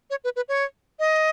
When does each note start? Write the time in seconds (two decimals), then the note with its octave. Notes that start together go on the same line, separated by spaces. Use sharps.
0.10 C#5
0.24 B4
0.36 B4
0.49 C#5
0.99 D#5